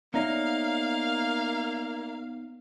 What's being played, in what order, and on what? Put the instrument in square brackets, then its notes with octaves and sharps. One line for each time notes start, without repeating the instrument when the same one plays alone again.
[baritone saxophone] A#3 [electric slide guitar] B3 D#4 C#5 [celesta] D5 E5 A#5 [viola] F5